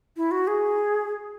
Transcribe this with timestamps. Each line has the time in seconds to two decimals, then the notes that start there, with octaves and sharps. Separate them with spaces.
0.17 E4
0.31 F#4
0.47 G#4